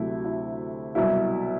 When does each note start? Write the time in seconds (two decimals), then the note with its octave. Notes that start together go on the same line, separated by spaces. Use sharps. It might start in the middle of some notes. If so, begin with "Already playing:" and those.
Already playing: D2 C3 F#3 A3 E4
0.25 E4
0.95 C2 B2 F#3 E4